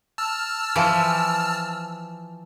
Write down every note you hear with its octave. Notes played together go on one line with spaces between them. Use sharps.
A5 E6 F6
E3 F3